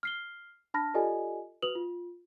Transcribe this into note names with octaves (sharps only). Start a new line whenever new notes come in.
F6 C7 G7
D4 A5 B5 F6 A#6
F4 G4 A4 D5 D#5 G#5
F#4 B4 D#6 F7 F#7
F4